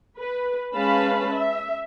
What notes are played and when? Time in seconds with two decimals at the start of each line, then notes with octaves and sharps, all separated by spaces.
0.18 B4
0.74 G#3 C#4 B4 F5 A5 B5
1.32 E5